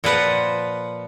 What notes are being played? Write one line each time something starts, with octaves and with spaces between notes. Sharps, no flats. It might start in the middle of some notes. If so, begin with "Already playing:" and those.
A#2 F3 B4 F#5